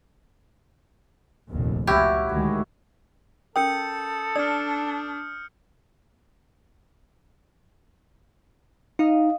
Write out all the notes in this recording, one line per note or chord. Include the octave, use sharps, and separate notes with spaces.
F1 A#1 D#2
C#2 A#2 E4 F#4 G4 C#5
D2 D#3 G#3 F#4
C#4 A4 A#4 G5 D#6 G6 C#7
D4 D5 D#6 F6
D#4 D#5 F5 D#6